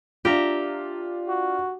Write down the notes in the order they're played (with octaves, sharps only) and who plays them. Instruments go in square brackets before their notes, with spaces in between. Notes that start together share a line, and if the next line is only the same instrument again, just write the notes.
[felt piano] D4 F4 [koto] G4 E5 A#5
[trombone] F#4